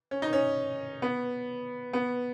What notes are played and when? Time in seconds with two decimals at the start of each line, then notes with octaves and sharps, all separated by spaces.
0.11 C#4
0.22 D#4
0.33 C#4
1.02 B3
1.93 B3